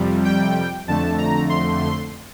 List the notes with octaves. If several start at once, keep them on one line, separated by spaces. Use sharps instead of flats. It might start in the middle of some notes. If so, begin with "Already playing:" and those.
Already playing: F2 C3 G3
G5
F2 D3 A3 A5
A#5
C6